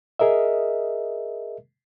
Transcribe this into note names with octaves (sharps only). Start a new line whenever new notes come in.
G#4 A#4 D#5 E5